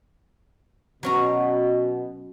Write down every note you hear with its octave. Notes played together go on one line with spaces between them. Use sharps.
B2 F#3 C#4 A#5